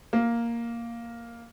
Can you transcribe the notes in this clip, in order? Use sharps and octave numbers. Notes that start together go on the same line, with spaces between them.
A#3